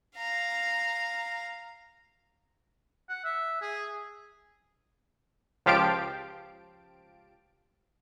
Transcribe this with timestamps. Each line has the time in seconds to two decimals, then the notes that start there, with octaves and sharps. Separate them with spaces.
0.16 F5 A#5
3.09 F#5
3.25 E5
3.62 G#4
5.66 C#2 F3 G4 F5 A5 D7